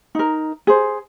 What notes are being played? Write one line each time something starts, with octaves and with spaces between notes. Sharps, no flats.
D#4 A#4
G#4 C5